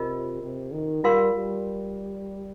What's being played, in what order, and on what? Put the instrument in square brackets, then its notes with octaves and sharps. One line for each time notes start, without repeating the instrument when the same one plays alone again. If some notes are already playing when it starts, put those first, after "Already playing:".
Already playing: [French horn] C3 [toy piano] F4 A#4 D#5
[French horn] C3
D#3
[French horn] G3 [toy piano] F4 A#4 F5 C6
[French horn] G3